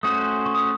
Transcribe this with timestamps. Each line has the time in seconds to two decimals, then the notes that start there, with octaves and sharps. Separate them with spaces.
0.03 A3 C#4 F#4 C5 D#6
0.45 C#6
0.54 D#6